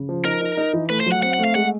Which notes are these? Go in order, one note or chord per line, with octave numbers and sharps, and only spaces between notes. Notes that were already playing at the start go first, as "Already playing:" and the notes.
Already playing: C#3
F3
D#4 A#4
D#4
D#4
E3
A3 B4
C5
F#3
F#5
C4 F#5
F#5
A3
F5
G#3 F#5